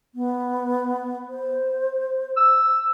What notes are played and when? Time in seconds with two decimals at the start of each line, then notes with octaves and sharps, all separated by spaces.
0.15 B3
1.29 C5
2.37 E6